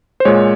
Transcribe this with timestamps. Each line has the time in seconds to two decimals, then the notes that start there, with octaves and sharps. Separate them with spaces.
0.20 C5
0.25 A#2 G#3 C#5